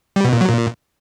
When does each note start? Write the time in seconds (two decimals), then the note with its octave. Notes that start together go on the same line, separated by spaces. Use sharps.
0.16 G3
0.24 B2
0.33 A#2
0.41 F#3
0.49 A#2